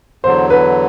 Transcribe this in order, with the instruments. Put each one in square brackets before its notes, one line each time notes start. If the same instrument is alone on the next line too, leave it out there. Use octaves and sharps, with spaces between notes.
[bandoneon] E2 D3 F#3 [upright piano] C5
[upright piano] B4